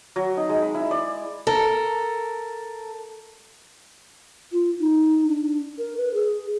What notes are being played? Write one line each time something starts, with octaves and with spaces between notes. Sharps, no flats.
F#3
D#4
G#3
B5
E4
D5
A4 A#4
F4
D#4
D4
A#4
B4
G#4